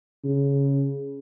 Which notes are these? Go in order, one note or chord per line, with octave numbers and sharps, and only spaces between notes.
C#3